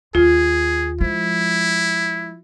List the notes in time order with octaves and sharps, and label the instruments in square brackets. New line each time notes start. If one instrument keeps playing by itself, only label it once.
[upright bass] D#2 [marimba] F4 [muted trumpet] G#4
[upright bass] F3 G#3 [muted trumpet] E4